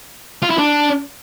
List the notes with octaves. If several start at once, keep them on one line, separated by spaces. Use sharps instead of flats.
F4
E4
D4